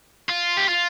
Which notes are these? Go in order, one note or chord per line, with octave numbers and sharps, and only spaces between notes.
F4
G4
F4